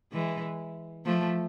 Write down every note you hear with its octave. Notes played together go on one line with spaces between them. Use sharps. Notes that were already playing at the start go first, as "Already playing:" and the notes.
E3 G#3
F3 A3